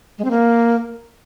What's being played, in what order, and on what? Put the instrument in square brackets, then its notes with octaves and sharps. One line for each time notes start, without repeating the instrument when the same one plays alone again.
[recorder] G#3
C4
A#3